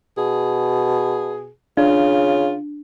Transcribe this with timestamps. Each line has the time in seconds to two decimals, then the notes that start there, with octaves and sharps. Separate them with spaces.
0.18 B2 G#4
1.77 C#3 D4 F4